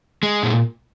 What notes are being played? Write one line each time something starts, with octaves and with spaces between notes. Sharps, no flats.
G#3
A#2